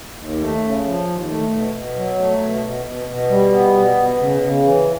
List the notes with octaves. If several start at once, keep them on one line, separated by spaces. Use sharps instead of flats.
D#2
A3
C#3
F3
D#2
A3
B2
B2
F#3
A3
B2
B2
B2
B2
G3
B3
B2
B2
C#3
C#3
E3